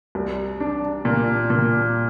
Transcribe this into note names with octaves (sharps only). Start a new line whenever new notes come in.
C2
D4
A#2
A#2